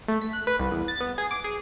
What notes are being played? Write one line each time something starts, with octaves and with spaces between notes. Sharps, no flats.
A3
B6
F#6
B4
C2
E2
A6
B3
G#4
D6
G#4